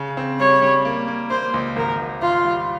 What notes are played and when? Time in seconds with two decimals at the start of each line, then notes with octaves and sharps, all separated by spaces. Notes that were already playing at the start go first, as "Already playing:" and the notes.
Already playing: C#3
0.17 C4
0.39 G3 C#5
0.62 G3
0.85 A#3
1.08 A#3
1.30 A#3 C5
1.54 C#2
1.76 G#1 A#4
1.99 G#1
2.22 G#1 F4
2.45 G3